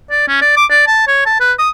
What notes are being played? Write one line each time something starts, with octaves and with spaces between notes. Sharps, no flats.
D5
C#4
D5
D6
D5
A5
C#5
A5
B4
D#6